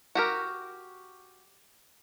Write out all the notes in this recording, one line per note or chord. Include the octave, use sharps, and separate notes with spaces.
F#4 G4 A#4